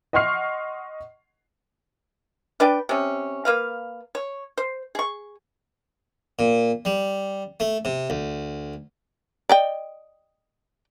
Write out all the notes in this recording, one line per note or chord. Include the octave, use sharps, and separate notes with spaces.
D#5 F#5 C6 C#6 F6 C7
D4 B4 D5 G5
C3 C#4
A#3 B4 F5
C#5
C5
G#4 C#6
A#2
G3
A3
C3
D2
D5 D#5 G5